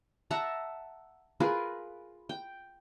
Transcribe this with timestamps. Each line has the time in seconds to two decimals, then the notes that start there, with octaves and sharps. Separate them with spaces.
0.31 E5 F#5 A5 A#5
1.40 F4 G#4 A#4 B4
2.29 G5